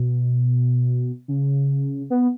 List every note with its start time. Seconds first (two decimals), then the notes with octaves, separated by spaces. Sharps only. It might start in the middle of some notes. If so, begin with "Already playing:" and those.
Already playing: B2
1.28 C#3
2.10 B3